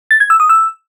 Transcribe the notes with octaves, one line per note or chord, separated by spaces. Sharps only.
A6
G#6
E6
D#6
E6